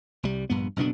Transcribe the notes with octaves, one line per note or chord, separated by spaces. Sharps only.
C2 G3
A#1 G2 B3
F#1 B2 B3 D4